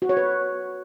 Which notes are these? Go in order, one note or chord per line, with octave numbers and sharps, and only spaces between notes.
F#4
C#5
B4